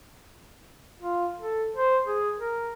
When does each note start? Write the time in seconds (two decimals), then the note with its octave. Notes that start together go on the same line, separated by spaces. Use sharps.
1.00 F4
1.41 A4
1.76 C5
2.06 G#4
2.37 A#4